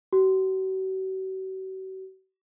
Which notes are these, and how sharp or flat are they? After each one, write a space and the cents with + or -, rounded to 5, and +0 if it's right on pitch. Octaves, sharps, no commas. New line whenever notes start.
F#4 +45